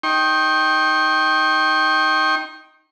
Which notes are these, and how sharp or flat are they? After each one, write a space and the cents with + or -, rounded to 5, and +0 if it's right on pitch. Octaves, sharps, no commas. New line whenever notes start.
D#4 +0 G5 -5 C#6 -45